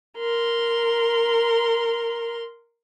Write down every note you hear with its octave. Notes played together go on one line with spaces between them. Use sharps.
A#4 C6